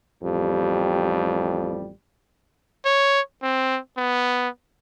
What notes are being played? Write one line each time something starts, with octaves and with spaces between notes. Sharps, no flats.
A1 F2 G3 G4
C#5
C4
B3